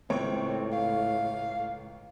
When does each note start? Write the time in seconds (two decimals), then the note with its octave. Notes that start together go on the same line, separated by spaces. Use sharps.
0.10 C#2 A2 C4 C#5 D7
0.73 F5